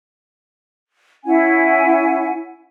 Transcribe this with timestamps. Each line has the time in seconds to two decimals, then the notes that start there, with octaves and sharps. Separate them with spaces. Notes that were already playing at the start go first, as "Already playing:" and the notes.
1.25 C#4 E4 F#5 G#5